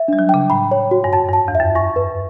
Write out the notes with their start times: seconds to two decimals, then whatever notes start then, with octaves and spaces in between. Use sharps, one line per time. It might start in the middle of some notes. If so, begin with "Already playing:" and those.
Already playing: E5
0.08 G3 D4
0.19 F#3
0.29 C#3 G5
0.50 A2 B5
0.71 C#5
0.91 F#4
1.04 G2
1.13 F#2 A5
1.29 G2
1.33 A5
1.48 E2
1.55 E5
1.60 F#2
1.75 G2 C#6
1.96 B4